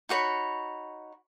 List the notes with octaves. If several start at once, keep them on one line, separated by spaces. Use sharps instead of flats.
D#4 F#4 C#5 B5